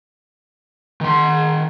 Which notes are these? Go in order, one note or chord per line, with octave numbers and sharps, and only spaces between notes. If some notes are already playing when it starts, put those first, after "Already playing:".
D#3 C6